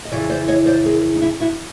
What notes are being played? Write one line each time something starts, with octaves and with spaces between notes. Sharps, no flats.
D#5
F2 C#3 E3 D5
C5 D5
C#5 D#5
C5 D5
G#4 A#4
D#4
D4 E4
E4 F#4